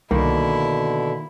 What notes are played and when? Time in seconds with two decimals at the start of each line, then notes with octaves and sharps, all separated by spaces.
0.11 C2 B2 D3 D#3 A#3 E4